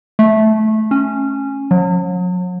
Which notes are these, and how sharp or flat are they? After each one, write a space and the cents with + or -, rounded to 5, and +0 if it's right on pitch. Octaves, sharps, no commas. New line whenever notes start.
A3 -15
C#4 -10
F#3 -40